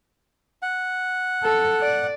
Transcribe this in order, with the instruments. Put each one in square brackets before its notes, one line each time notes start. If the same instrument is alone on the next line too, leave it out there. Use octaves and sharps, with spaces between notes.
[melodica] F#5
[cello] A4
D5